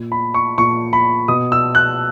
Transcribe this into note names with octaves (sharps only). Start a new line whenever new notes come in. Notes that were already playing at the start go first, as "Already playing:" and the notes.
Already playing: A#2
B5
C#6
A#2 C#6
B5
B2 D#6
E6
F#6